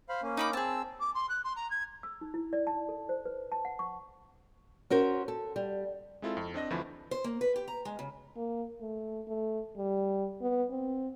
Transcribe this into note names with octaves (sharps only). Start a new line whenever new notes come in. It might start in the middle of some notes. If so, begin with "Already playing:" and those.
C5 F5 B5
A#3 C#4
D#4 B5 D6
C4 G#4 A5 E6
D6
C6
F#6
C6
A#5
G#6
E6
D#4
E4
D5
A5
A4
C5
B4
A5
F#5
C#6
C#4 F#4 A#4 C5
A4
G3
G#3 C4 E4 F4 A4
F2
C4 D4 D#5 A#6
D2 E3 F3 A3 B5
C5
A#3
B4
G4
A#5
G#3
C#3
A#3
A3
A3
G3
B3
C4